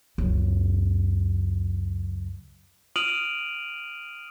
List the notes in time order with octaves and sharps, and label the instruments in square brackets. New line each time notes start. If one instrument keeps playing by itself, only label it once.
[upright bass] C#2 F#2
[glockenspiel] D#6 F6 D7 D#7 F7 F#7